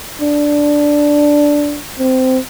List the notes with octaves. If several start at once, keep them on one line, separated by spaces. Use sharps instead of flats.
D4
C4